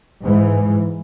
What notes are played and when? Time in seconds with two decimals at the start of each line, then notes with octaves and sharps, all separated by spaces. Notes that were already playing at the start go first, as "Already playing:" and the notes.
0.22 G#2 E3